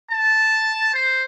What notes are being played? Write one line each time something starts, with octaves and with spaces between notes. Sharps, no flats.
A5
C5